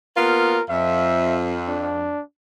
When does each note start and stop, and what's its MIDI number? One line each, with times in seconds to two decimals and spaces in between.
0.17 0.57 58
0.17 0.57 59
0.17 0.57 65
0.17 0.63 70
0.69 2.14 41
0.69 1.35 76
1.68 2.21 62